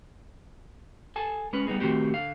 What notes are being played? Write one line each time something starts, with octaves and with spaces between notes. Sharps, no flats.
A4 G#5 A5
G#3 C#4 F4 B4
G3 B3 D#4 G#4
D#3 A3 C4 F#4 G4
D3 F5